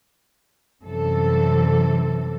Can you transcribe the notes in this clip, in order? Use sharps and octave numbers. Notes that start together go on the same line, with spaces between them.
F#2 C3 E3 G3 A4